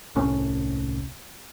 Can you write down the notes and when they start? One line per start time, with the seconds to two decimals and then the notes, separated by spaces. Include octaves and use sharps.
0.15 D#1 C2 A2 C#4